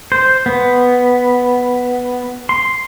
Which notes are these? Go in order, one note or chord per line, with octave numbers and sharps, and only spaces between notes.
C5
B3
C6